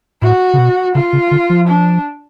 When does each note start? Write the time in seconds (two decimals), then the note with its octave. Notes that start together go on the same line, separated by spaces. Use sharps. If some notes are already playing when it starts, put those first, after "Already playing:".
0.22 A2 F#4
0.53 C#3
0.58 B2
0.94 C#3 F4
1.13 C#3
1.31 D3
1.50 F3
1.68 D4